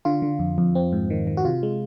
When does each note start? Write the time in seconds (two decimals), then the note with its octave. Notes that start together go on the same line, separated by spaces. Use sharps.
0.05 D3 F4
0.22 D3
0.39 F2
0.58 F2
0.75 C4
0.92 G#2
1.10 D#3
1.27 D#3
1.37 F#4
1.45 C3 F4
1.63 G#3